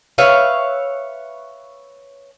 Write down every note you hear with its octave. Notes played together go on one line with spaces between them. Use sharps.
B4 C#5 E5 F5